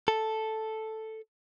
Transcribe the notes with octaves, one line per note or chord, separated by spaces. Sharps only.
A4